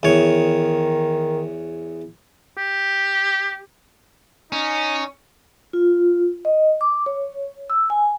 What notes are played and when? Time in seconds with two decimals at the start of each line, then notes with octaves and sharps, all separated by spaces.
0.03 E2 D#3 C#5
2.57 G4
4.52 C#4 D#4
5.73 F4
6.45 D#5
6.81 D6
7.06 C#5
7.70 E6
7.90 G#5